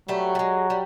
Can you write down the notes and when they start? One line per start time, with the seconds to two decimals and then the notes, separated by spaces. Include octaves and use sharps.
0.08 F#3 G3 A3
0.35 G3
0.39 G#3
0.70 G3